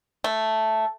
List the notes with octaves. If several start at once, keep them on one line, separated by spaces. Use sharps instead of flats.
A3